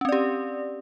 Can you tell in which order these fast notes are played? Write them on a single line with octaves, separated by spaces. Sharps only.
C#4 C4 D5 G4